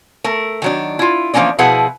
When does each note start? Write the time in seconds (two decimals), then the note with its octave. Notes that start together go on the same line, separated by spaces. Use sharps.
0.24 A3 A#4
0.62 D#3 F#3 D4
0.99 E4 F4
1.34 E3 F3 G#3 A#3 C#4 D4
1.58 B2 F3 E4 G#4 B4 F#5